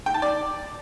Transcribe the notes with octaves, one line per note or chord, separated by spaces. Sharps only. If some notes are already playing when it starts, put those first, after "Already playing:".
G5
A5
D5